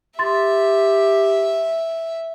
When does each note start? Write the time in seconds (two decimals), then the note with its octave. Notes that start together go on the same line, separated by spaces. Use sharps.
0.19 G4 E5 C6 A6